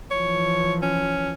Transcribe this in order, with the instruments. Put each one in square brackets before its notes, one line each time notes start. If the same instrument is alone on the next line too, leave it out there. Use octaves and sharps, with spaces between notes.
[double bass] E3 F3 [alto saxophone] C#5
[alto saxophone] C#4